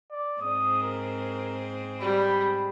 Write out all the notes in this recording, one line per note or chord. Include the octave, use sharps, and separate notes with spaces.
D5
G#2 C4 G#4 D#6
A#4
G3 B5